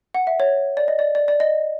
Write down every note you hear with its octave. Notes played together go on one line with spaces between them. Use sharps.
F#5
E5
C#5
D5
D#5
D5
D5
D5
D#5